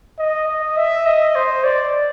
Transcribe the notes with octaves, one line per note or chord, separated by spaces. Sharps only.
D#5
D#5
E5
D#5
C5
D5